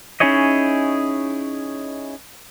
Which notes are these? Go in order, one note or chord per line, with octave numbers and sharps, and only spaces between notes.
C#4 D#4 E4 G#4 C#5 D#5